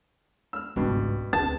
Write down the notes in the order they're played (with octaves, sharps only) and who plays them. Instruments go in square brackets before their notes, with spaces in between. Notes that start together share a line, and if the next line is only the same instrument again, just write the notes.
[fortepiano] E6 F6
[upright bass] G#1 C#2 [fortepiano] G2 B2
[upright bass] D2 C4 [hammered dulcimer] A5